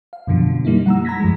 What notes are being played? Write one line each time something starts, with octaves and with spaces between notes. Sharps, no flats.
F5
F#2 B2 D3 F3 F#3
G3 A#3 D#4 E4
F#5 A#5 E6
A#5 B5 G#6 A#6 B6
F#2 F3 G#3